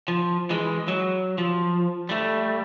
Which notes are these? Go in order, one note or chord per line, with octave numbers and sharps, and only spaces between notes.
F3
E3 G#3
F#3
F3
G3 A3